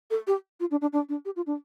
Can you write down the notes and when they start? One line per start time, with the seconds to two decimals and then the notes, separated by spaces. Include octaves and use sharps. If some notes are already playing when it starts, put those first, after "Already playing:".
0.10 A4
0.27 G4
0.60 F4
0.71 D4
0.81 D4
0.93 D4
1.09 D4
1.25 G4
1.36 F4
1.46 D4